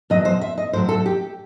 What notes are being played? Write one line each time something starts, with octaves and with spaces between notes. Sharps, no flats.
E2 B2 F#3 D#5
C5
E5
D#5
A2 F#3 C5
A4
G4